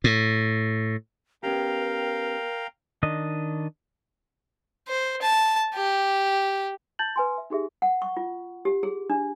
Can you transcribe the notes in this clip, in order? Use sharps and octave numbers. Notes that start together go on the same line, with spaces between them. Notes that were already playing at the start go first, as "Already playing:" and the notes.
A2
B3 C#4 G4 A#4 F5 G5 A#5
D#3 D4 D#5
C5
A5
G4
A5 G6 A6 F#7
B4 G#5 C6
E5
D#4 G4 G#4 E5
F#5
C#6
F4
G4
G#4
D4